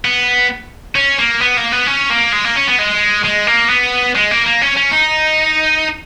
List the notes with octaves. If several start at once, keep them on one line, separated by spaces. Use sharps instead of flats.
B3
C#4
A#3
B3
A#3
B3
C#4
A#3
G#3
A#3
C#4
B3
G#3
G#3
A#3
B3
G#3
A#3
A#3
C#4
C#4
D#4